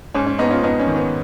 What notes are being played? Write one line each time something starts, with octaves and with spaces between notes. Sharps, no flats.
G#2 C#4
C#4
G#2 B3 D#4
C#4 F4
F2 B3 D#4
C#4
D#3
B3